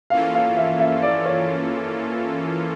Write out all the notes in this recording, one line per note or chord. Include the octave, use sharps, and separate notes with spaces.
E3 A#3 C#4 F4 A4 F5
F5
E5
E5
D5
C#5